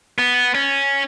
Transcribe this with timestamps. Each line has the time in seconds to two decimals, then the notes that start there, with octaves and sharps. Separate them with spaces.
0.18 B3
0.55 C#4